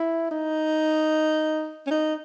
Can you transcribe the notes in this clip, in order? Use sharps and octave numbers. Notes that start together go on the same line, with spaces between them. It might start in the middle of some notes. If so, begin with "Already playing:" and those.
Already playing: E4
D#4
C#4
D#4